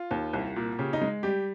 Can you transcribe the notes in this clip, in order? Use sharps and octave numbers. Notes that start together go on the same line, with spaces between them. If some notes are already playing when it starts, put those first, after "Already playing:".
Already playing: F4
D#2
C2
A#2
C#3 G4
D#4
G#3
G3 G4